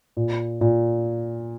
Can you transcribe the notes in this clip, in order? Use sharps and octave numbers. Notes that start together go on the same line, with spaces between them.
A#2
A#2